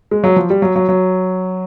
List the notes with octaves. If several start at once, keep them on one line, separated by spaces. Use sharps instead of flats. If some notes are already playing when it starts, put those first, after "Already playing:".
G#3
F#3
F3
G3
F#3
F#3
F#3